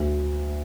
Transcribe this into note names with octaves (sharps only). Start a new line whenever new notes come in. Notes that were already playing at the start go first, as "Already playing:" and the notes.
Already playing: D2